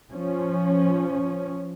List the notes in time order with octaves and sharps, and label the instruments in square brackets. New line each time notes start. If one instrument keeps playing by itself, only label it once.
[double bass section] F3 C#4